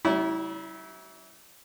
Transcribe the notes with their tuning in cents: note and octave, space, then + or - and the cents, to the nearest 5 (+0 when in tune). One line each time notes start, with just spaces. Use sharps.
G3 -45 C#4 +5 E4 -20